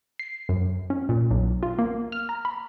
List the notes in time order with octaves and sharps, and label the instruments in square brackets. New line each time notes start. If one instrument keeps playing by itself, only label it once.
[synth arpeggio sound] C7
F#2
C#4
A#2
B1
F4
A#3
F6
A#5
B5